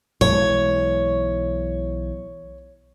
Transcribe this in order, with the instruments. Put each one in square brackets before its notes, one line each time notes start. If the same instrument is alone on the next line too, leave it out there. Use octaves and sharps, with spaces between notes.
[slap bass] B1 E3 G#3 [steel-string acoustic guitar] C#5